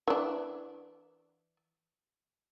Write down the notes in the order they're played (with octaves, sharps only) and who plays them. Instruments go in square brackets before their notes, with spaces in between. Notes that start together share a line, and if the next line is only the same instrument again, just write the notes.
[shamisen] E3 D4